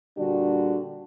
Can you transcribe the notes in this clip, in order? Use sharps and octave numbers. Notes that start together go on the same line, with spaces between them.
A#2 D3 G3 D4 F#4 G4